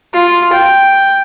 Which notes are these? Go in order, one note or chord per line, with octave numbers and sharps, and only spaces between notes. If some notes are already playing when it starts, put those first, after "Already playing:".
F4
G5